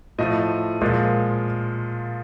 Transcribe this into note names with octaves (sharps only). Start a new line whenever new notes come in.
A2 F3 A3 D#5
A#2 F3 G#3